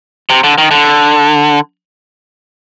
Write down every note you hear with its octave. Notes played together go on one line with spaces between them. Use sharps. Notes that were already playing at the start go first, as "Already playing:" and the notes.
C3
D3
D#3
D3